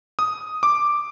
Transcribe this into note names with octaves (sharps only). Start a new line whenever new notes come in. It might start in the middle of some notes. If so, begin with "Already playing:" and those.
D#6
D6